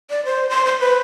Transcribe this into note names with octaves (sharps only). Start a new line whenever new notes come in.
D5
C5
C6
C5
B4